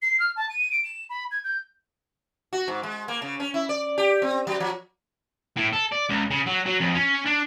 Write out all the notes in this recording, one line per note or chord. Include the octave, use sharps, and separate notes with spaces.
C7
F6
A5
D#7
D7
E7
B5
G#6
G6
F#4
G#2
G#3
A#3
C#3
C#4
E4
D5
G4
C4
F#3
F3
A2
A4
D5
C#2
C#3
F#3
F#3
F2
C#4
D4